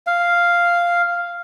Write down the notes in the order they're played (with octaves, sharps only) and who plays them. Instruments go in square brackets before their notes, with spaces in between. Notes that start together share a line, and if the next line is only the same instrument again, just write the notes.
[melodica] F5